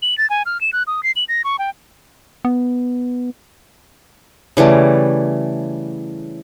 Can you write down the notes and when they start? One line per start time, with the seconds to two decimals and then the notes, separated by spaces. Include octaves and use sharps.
0.02 F#7
0.18 A6
0.30 G#5
0.46 F6
0.61 E7
0.73 F#6
0.87 D#6
1.03 C7
1.16 F#7
1.29 A#6
1.44 C#6
1.59 G5
2.45 B3
4.57 C#3 E3 G3 A3